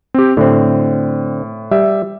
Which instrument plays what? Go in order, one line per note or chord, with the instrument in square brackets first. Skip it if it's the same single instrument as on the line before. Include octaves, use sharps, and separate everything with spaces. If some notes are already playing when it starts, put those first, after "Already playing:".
[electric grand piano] C4 G4
[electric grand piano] A2 [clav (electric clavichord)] D3 C4
[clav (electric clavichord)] G3 [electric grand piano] E5